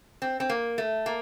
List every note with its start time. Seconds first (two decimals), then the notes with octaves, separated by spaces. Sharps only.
0.22 C4
0.40 C4
0.49 A#3
0.78 A3
1.06 A#3